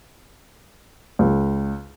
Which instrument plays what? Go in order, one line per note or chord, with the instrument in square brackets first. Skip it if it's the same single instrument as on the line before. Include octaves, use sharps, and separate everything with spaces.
[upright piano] C#2